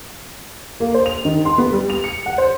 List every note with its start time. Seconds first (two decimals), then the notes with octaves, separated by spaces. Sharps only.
0.80 A#3
0.94 C5
1.06 F7
1.25 D#3
1.45 C6
1.58 B3
1.73 G3
1.90 F7
2.04 C#7
2.26 F#5
2.38 C5